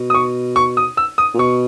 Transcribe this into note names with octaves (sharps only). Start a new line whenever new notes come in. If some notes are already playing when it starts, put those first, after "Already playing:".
Already playing: B2
D#6
C#6
C#6
D#6
E6
D#6
A#2
B2 C#6